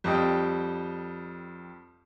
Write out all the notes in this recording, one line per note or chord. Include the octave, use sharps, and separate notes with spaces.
F2 G3 D#5 G5